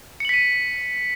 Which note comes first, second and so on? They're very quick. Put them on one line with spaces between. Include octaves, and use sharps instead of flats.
C#7 F#7 B6 D#7